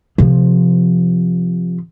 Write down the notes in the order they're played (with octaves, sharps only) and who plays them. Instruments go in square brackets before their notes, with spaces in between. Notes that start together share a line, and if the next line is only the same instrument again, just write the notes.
[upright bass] C3 F3